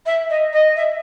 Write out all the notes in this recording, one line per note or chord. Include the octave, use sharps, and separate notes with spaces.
E5
D#5
D#5
E5